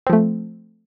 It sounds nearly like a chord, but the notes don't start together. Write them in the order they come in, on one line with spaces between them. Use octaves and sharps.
C4 F3 A3